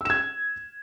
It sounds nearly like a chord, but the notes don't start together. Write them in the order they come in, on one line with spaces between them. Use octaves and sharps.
E6 E7 G#6